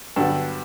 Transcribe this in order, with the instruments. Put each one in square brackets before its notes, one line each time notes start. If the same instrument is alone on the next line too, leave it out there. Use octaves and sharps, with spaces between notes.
[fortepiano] G2 D3 F#3 B3 A4